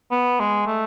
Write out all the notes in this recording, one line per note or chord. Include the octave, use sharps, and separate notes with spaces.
B3
G#3
A3